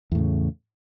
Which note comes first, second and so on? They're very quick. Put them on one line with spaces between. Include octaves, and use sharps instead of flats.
E2 A2 C#3